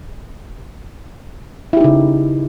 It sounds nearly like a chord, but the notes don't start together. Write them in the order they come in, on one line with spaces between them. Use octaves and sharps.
E4 G4 D#4 C#3